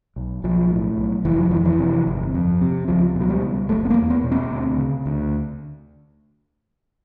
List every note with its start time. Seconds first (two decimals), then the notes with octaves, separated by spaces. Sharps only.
0.16 B1
0.44 B1 F3
0.71 A2
0.98 B1
1.25 F1 E3
1.38 F3
1.51 F2 E3
1.65 E3
1.79 C3
2.07 G1
2.34 F2
2.61 C3
2.88 C#2 F3
3.16 B2
3.21 F#3
3.29 G3
3.42 C#2
3.69 F#1 A3
3.85 B3
3.90 A#3
3.98 E2
4.10 B3
4.24 B2
4.32 C4
4.51 D2
4.78 C#3
5.06 D2